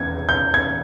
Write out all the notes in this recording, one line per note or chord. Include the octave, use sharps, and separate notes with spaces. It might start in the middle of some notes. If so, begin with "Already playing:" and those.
Already playing: E2 G#6
G6
G#6